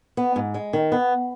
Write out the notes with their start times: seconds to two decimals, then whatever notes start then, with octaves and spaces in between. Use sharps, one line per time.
0.17 B3
0.36 G#2
0.54 G#3
0.73 D#3
0.92 B3